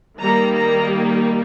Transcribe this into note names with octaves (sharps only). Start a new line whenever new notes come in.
D#3 G3 A#3 A#5
A#5